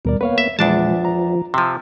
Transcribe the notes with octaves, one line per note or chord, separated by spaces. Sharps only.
D#2 B2 G3 A#4 D5
A#3 B3 B4 C#5 F5
E5
E2 A#2 E3 F3 G#3 D4 A5
A#5
C3 F3 C6 E6